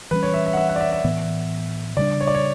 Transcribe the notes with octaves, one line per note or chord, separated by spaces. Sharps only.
E3 G3 C#4 B4
C#5
E5
E5
F#5
E5
F#5
D5
E5
E5
A2 E3 B3
C#3 G3 D4 D5
C#5
D5
C#5